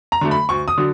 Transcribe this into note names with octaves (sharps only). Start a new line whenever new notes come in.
A#5
D3 F#3 A3
B5
D2 C#6
D#6
D3 F#3